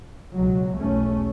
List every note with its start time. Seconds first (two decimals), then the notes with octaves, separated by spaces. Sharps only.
0.33 C#2 B2 F#3
0.76 B1 E2 A3 C#4